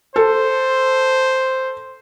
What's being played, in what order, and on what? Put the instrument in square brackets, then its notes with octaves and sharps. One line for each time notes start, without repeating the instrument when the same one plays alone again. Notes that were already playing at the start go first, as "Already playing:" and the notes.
[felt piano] A4 [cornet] C5